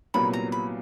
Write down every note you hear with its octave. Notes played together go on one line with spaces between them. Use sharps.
C2 A#2 F#3 B3 B5
A#5
B5